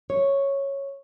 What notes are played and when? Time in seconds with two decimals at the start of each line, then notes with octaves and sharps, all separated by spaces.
0.10 C#5